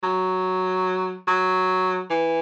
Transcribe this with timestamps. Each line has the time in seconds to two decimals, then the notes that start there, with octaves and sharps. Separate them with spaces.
0.03 F#3
1.28 F#3
2.10 E3